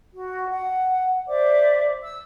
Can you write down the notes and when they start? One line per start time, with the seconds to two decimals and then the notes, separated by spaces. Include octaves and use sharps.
0.13 F#4
0.50 F#5
1.28 C5 D5 E5 D6
2.03 E6